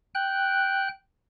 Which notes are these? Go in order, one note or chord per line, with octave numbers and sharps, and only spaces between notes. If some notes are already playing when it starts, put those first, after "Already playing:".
G5 F#6